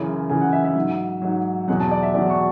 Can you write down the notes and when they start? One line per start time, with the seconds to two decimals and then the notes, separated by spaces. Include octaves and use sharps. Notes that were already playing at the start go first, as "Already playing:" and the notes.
Already playing: F#2 C#3 E3
0.29 F#2 C#3 E3 G#5
0.41 F#5
0.53 E5
0.64 E5
0.76 G#2 F#3
1.22 G#2 F#3
1.68 E2 B2 F#3 F#5
1.80 A5
1.91 D5
2.03 E5
2.14 E2 B2 F#3 D5
2.30 C#6